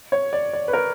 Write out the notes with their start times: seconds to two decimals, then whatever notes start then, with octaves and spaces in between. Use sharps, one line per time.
0.12 C#5
0.33 D5
0.53 D5
0.68 B4
0.73 A#4